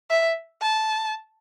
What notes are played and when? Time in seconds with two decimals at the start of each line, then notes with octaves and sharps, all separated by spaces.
0.10 E5
0.62 A5